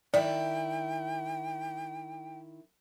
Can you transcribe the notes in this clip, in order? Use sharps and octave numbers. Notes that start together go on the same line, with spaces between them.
D#3 E4 D5 G5